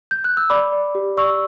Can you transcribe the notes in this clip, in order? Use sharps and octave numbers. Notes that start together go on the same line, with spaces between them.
G6
F#6
E6
D5 B5 D6
D5
G4
D5 C#6 E6